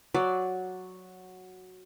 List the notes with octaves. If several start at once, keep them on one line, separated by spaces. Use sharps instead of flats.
F#3 D5